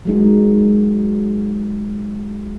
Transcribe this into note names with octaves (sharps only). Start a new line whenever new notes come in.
F#3 G#3 D#4